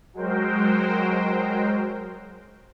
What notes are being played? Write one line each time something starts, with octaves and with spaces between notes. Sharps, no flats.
F#3 G#3 F#4 A#4 C5 G5